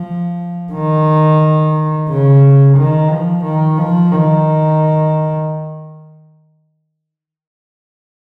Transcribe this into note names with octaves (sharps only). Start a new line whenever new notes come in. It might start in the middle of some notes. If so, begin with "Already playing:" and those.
Already playing: F3
D#3
C#3
D#3
F3
D#3
F3
D#3